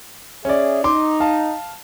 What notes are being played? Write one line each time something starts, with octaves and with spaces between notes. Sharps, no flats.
C#4 G#4 D5 E5
D#4 C6 D6
F5 A5